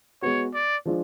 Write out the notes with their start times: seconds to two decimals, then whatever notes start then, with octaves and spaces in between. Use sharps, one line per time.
0.22 G#3 B3 F#4 C#5
0.54 D5
0.86 F3 G#3 D4 F4